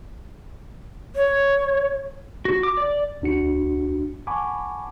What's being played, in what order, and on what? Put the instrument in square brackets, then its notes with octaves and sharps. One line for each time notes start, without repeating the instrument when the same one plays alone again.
[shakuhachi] C#5
[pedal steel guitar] F#4
D6
D5
[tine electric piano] D2 D4 F#4 C#7
F#5 G#5 A5 B5 C#6 D6